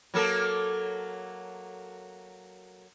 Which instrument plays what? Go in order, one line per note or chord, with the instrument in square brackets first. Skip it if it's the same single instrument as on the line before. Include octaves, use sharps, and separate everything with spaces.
[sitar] F#3 A#3 A4